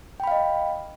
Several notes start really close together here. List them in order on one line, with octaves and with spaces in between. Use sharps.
G5 B5 F5 D#5